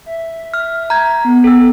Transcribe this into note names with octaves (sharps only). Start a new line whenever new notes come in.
E5
F6
A#5 G6 G#6
B3
A4 G5 E6